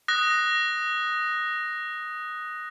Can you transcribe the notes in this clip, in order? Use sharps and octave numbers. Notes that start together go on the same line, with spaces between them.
D#6 F#6 A#6